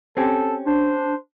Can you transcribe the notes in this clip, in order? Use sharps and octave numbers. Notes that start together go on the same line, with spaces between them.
C4 C#4 G4 A4
D4 C5